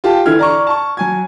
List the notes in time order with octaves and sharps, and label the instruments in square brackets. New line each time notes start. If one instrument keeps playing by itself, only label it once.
[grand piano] F4 G4 A5
D3 E3 E4 A4 F6 G#6
D5 A#5 C#6
A5 C#6
F#3 G#5 G#6